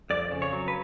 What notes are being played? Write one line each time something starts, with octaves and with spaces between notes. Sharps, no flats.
F2 D5
C#3
C#5
F#3
B4